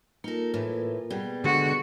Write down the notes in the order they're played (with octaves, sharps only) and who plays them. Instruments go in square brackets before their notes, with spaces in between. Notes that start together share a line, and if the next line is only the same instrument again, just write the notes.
[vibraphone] A#3 F4 A#4 [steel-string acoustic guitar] D#4 A4
[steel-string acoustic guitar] A2 E3
[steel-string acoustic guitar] B2 G3 [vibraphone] G#4 G5
[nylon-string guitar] D3 G#3 [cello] F#4